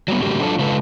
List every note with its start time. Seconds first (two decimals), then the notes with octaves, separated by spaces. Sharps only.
0.08 F#3 G3 B3
0.23 A2 D3 G3 A#3 F#4 G4
0.43 F#3 D4 F4 A4
0.59 C#3 G#3 F4 A4 B4